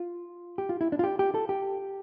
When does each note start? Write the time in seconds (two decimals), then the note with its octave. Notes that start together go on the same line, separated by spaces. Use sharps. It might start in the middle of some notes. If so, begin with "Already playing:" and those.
Already playing: F4
0.58 G4
0.69 F4
0.81 E4
0.92 D4
0.99 F4
1.04 G4
1.19 G4
1.34 A4
1.49 G4